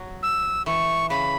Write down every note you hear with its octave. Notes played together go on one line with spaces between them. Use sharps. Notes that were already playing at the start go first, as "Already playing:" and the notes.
Already playing: F#3
E6
E3 C#6
C#3 B5